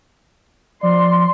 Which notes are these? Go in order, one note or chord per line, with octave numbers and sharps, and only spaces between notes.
F3 D5 C6